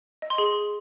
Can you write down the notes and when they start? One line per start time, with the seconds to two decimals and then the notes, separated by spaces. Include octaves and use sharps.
0.22 D#5
0.30 C6
0.38 G#4